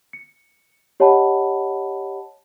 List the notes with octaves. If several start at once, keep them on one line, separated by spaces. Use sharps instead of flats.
C#7
G4 C#5 D#5 F#5 A5 B5